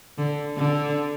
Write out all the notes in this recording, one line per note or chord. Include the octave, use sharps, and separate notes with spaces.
D3
D3